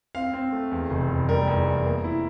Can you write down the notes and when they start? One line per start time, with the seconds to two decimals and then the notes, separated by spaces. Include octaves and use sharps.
0.15 C4 F5
0.34 C4
0.52 A3
0.71 E2
0.90 F1
1.10 F1
1.28 G3 A#4
1.47 E2
1.66 E2
1.86 A#3
2.04 E4